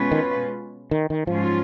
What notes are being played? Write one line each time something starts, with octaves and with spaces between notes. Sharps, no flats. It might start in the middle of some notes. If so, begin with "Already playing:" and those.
Already playing: B2 G#3 C#4 F4 B4
D#3
D#3
D#3
G#2 F3 F#3 C#4 F4